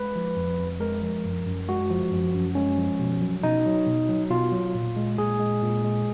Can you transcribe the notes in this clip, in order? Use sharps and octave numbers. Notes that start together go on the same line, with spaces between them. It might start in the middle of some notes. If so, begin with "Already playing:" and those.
Already playing: G#3 B4
F3
F2
F2
G#3 A#4
F3
F#2
F#2
G#3 F#4
F3
F#2
F#2
G#3 C#4
F3
B2
F#3
B2 D#4
F#3
B2
F#3
B2 F4
F#3
A#2
G#3
A#2 G#4
G#3
A#2
G#3